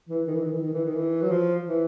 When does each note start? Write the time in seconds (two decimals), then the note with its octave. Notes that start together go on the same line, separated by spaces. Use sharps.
0.09 E3
0.27 D#3
0.35 E3
0.43 D#3
0.53 E3
0.61 D#3
0.73 E3
0.85 D#3
0.96 E3
1.22 F#3
1.31 F3
1.67 E3